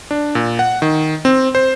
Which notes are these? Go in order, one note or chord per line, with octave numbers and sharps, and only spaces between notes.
D4
A#2
F#5
D#3
C4
C5